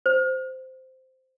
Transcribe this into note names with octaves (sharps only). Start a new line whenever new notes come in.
C5